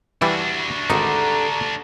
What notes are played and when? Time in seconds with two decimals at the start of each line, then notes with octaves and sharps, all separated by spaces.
0.22 E3 G3 D4 E4 F#4
0.90 G#1 D3 G3 D#4 B4 A#5